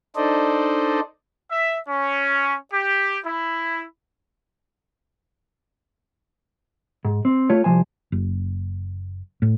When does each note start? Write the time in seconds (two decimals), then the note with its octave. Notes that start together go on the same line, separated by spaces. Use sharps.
0.16 D4 D#4 A4 C5 D5 D#5
1.51 E5
1.88 C#4
2.72 G4
3.25 E4
7.05 G#2
7.25 C4
7.50 A3 F4 C#5
7.64 C2 G2 F3 C5 G#5
8.12 F#1
9.42 A2